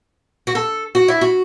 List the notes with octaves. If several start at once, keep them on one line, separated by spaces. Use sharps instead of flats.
F#4
A4
F#4
E4
F#4